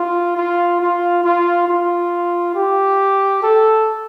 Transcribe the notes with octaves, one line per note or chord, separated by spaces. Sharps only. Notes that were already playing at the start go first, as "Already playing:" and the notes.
Already playing: F4
F4
F4
F4
F4
G4
A4